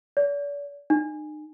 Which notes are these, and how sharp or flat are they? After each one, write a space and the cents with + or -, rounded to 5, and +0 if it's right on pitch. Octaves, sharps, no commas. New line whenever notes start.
D5 -40
D#4 -40